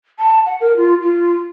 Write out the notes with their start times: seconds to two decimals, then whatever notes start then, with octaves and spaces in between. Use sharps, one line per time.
0.19 A5
0.45 F#5
0.60 A#4
0.76 F4
1.02 F4